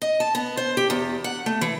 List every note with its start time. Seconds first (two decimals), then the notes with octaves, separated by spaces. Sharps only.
0.02 D#5
0.20 A5
0.35 B3
0.57 C5
0.77 G4
0.90 E2
1.24 F#5
1.46 A3
1.61 E3